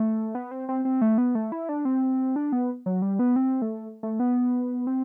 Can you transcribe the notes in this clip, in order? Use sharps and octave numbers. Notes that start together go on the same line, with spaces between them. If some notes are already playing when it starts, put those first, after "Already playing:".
Already playing: A3
B3
C4
C4
C4
A3
B3
A3
E4
D4
C4
D4
B3
F#3
G3
B3
C4
A3
A3
B3
C4